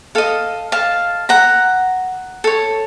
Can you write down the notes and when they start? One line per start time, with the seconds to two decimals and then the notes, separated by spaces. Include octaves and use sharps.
0.15 A4 D#5 F5
0.72 F5 A5
1.29 F#5 A#5
2.44 A4 C#5